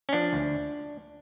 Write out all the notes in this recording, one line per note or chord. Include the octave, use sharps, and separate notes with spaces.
C#4
F3 D4
D2